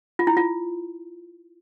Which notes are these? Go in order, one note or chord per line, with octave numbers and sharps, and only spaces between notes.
F4
E4
F4